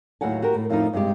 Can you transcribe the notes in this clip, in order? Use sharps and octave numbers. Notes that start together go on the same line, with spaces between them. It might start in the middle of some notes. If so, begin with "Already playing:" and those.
D#2 A2 F#3 F#5 G#5
F#4 G4 A#4
A2
F2 A2 F3 A#3 D#4
G2 C3 G#3 G4